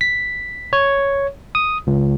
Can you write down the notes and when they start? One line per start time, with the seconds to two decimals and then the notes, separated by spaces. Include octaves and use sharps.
0.01 B6
0.73 C#5
1.55 D#6
1.87 C#2